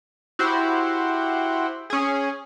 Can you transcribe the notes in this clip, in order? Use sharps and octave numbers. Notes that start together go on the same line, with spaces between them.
E4 F#4 G4 C5
C#4 G#4